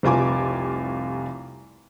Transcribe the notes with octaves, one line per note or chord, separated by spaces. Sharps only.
F1 C2 F4 G#5 D6